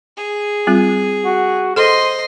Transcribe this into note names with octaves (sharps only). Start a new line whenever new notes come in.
G#4
G3 C4 F4
F#4
A4 C5 D#5 C6